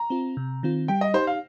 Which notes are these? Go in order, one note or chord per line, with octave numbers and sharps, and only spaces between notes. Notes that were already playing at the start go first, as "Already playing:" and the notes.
Already playing: A#5
C4 F4
C3
D#3 C4 F4
G3 G5
D#5
D#4 G4 C5
F5